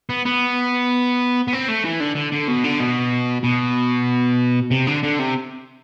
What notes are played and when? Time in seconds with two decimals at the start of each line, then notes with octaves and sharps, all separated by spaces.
0.09 B3
0.25 B3
1.48 B3
1.53 C4
1.68 A3
1.85 E3
2.00 D3
2.16 D3
2.32 D3
2.48 B2
2.64 D3
2.80 B2
3.44 B2
4.71 C3
4.87 D3
5.03 D3
5.19 C3